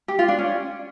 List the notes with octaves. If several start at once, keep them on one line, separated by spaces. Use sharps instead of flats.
G4
F4
D4
C#4